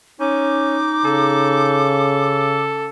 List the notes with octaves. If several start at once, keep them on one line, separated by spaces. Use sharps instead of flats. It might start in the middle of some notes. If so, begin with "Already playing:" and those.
C#4 D#4 D6
C#3 A4